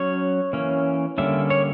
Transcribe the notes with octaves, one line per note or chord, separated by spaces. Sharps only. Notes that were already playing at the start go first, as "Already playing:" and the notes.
Already playing: F#3 C#4 C#5
E3 A#3 C#4
D3 G3 A#3 C#4 E5
C#5